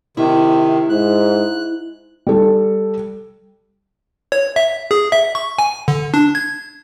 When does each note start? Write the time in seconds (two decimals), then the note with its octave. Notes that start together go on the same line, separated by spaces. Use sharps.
0.17 C3 D#3 E4
0.89 G#2 F#6
2.27 G3 A4
4.32 C#5
4.56 E5
4.91 G#4
5.12 E5
5.35 C#6
5.59 G#5
5.88 D3
6.14 D4
6.35 G#6